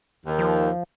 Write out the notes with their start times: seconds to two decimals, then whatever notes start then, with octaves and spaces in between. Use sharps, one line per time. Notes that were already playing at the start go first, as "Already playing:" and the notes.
0.25 D#2 D#3
0.39 F3